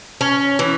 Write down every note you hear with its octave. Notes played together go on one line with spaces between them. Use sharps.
C#4
E3